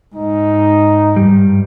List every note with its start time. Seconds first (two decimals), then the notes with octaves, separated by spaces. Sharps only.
0.15 G#2 D#4
1.16 G2 G3